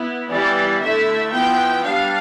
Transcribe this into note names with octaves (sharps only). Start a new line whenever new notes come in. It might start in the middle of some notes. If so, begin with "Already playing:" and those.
Already playing: B3 E4
E3 G3 B3 E4 D5
D3 A3 E4 E5
F3 B3 E4 G5
G3 D4 F5